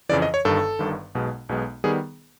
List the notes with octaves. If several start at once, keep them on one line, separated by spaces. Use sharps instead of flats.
F2 C#3 E3 D5
D#5
C#5
G1 G2 D#3 A4
G1 G2 D#3
B1 B2 G#3 B3
B1 B2 G#3 B3
D#3 G3 B3 G#4